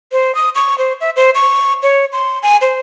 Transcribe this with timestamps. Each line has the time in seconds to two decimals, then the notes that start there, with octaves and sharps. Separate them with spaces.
0.12 C5
0.35 D#6
0.55 C#6
0.78 C5
1.01 E5
1.16 C5
1.35 C#6
1.83 C#5
2.12 C6
2.43 G#5
2.61 C5